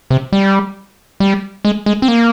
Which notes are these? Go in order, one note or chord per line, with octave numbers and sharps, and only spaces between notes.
C3
G3
G3
G#3
G#3
C4
A#3